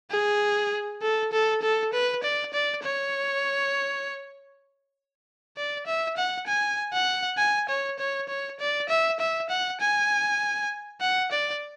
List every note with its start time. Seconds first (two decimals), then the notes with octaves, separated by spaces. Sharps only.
0.11 G#4
1.02 A4
1.32 A4
1.62 A4
1.93 B4
2.23 D5
2.53 D5
2.83 C#5
5.57 D5
5.87 E5
6.17 F#5
6.47 G#5
6.93 F#5
7.38 G#5
7.69 C#5
7.99 C#5
8.29 C#5
8.60 D5
8.89 E5
9.20 E5
9.49 F#5
9.80 G#5
11.01 F#5
11.31 D5